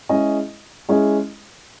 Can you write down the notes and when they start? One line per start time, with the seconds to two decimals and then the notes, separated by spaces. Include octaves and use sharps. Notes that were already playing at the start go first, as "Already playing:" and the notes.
0.09 G#3 C#4 E4 G#4 D#5
0.89 G#3 C#4 E4 G#4 D#5